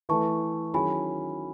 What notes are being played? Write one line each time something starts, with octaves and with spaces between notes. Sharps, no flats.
E3 A3 E4 A4 A5 C#6
D#3 F#3 C#4 E4 G#4 G#5 B5